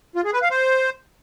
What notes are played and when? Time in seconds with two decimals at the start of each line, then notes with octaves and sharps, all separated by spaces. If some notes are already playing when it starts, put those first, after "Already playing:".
0.16 F4
0.24 G#4
0.33 B4
0.42 F5
0.51 C5